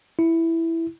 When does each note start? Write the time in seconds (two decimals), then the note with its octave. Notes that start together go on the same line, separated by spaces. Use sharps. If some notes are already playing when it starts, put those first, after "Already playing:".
0.19 E4